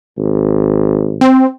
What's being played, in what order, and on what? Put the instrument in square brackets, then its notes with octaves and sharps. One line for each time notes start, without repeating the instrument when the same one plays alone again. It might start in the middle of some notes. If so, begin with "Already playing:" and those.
[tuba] G#1
[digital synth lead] C4